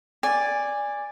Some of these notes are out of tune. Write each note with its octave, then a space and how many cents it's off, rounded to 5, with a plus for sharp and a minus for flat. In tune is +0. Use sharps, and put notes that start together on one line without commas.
D5 +0 G#5 -15